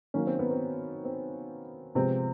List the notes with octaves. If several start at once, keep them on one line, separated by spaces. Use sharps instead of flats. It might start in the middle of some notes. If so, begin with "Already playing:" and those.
D#3 F#3 A#3 C#4
C4
B3
C4
C4
C3 F3 G#3 B3 C4